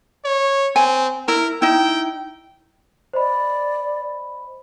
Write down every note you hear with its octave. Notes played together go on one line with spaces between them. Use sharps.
C#5
C4 G#5
E4 A#4
D#4 E4 G5
C5 D5 D#5 B5